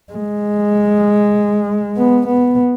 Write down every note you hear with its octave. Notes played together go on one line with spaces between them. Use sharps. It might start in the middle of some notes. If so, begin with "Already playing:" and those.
G#3
B3
B3